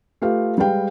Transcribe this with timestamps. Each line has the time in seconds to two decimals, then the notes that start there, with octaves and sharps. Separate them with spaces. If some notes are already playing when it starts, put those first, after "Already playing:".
0.22 A3 F4 G4 B4 F5
0.58 G3 G#3 B4 F5 G5